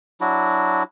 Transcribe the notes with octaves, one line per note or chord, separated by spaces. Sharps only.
F#3 D4 E4 F#4